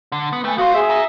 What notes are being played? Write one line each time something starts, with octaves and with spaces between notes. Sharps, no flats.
D3
B3
A3 B4 G5 G#5
B3 F#4 C5 F5
G#4 E5
D#5 A#5